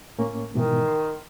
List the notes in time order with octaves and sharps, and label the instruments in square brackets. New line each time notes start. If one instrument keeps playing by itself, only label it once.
[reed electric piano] A2 A#3 C#4
[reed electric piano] G#2 B2 E3 [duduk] D#3
[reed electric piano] C6